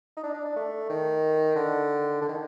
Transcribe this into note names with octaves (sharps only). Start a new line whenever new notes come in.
D#4
D4
D4
D4
A3
D#3
D3
D3
D#3